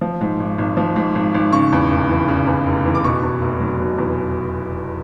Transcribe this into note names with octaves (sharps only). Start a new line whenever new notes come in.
F3
G#2
G#1
G#1
F3
G#2
G#1
G#1
C#3 C#6
E2
F1
E3
C#3
E2
F1
E3
D6
B2 C#6
E2
F1
F#3
B2
E2